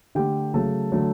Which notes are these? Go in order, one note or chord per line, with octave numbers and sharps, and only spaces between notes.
D3 A3 G4 G5
C#3 F#3 A3 A4 A5
D3 F#3 A3